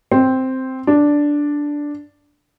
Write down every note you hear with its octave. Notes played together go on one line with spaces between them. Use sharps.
C4
D4